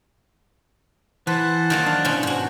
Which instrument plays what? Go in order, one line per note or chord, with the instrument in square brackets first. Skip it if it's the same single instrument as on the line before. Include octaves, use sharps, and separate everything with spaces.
[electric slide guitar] E3 [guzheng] B4 [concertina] C5 F#5 A5
[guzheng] D#3 F#3 A#3
[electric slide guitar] D4 [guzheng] F5
[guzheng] B2 C#4 E4
G#2 F#4